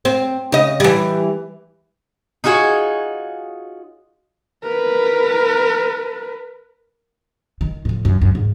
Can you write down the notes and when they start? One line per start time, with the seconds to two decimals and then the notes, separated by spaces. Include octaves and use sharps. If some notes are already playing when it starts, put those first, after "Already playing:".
0.05 C4
0.52 C#3 D#5
0.80 E3 G3
2.44 D#4 F4 F#4 G#4 C#5
4.63 A#4 B4
7.61 D#3
7.85 A2 F3
8.05 F#2
8.22 F#2
8.35 G#2